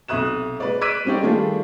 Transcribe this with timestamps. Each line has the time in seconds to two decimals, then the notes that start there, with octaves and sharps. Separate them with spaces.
0.08 B1 C3 E5 D#6 F#6 E7
0.60 G#3 B4 D5
0.81 D6 E6 F#6 B6 D7 D#7
1.05 G3 C4 C#4 D#4 G4 D5
1.23 D#3 G3 A3 D4 F4 G#4